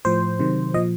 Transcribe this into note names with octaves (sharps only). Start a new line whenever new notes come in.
A2 F3 C5
C3 D#3 F#3
A#2 F3 D#5